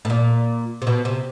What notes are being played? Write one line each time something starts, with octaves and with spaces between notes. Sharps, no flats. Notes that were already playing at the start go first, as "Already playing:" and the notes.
A2
A#2
C3
B2
C3